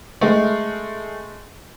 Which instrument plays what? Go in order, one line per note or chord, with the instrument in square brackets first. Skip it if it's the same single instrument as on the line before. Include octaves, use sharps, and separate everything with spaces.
[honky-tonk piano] G#3 A3